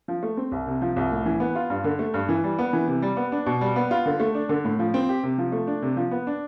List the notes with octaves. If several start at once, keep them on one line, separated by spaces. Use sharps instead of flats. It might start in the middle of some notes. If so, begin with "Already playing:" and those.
F3
A3
C4
C2
C3
F3
C2
A2
E3
B3
F4
G2
D3
A3
G2
E3
G3
B3
E3
C3
G3
B3
D4
B2
G3
B3
F4
D3
A3
D4
D3
A2
F3
C4
G4
C3
F3
A3
D4
C3
F3
B3
D4